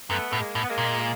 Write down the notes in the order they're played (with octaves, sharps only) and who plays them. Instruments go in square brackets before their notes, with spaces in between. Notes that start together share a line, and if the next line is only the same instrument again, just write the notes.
[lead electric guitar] F#2 [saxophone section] A3 B3
[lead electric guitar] A2 [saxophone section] A3
[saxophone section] G#3 A#3
[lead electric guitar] A2
[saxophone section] B3
G#3 A#3
[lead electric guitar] A#2
[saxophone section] G#3 A#3